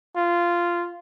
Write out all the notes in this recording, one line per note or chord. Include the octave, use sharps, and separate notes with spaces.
F4